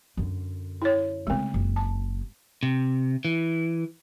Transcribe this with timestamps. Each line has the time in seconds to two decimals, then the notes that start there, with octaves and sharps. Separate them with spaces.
0.17 F#2 D3
0.82 E4 C#5
1.27 C#3 G#3 A3 C4
1.54 F#1
1.76 A5
2.63 C3
3.25 E3